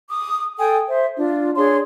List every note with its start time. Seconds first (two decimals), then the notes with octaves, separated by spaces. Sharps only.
0.10 D6 D#6
0.58 A4 G5 G#5 D#6
0.89 C5 E5
1.17 D4 F4
1.56 D4 G#4 C#5 C6